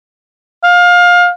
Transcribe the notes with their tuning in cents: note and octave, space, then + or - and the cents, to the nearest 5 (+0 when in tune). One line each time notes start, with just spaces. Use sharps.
F5 +25